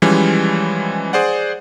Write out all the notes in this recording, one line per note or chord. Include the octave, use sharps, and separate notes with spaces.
E3 F3 G3 G#3 C#4
G#4 C5 D5 F#5